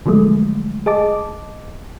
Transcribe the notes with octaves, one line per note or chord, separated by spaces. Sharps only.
D3 F3 F#3 G#3 A3
G#4 D#5 A5 D6